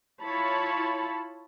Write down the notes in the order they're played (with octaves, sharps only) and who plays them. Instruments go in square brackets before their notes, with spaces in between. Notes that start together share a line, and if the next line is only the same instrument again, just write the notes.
[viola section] E4 F4 C#5 A5 B5